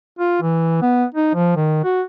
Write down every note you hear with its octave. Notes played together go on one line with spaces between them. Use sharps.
F4
E3
B3
D#4
F3
D#3
F#4